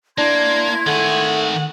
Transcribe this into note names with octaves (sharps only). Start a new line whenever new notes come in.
A#3 D4 E4 C6 G#6
D#3 A3 G#4 F#5